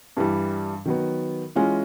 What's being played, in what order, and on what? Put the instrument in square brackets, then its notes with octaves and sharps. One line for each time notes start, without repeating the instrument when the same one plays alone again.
[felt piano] G2 E3 G3
D#3 F#3 B3
E3 G#3 C#4 F4